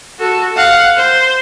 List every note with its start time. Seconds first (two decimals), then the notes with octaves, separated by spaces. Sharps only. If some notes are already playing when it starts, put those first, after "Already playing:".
0.20 F#4 A4
0.57 F5 F#5
0.97 C5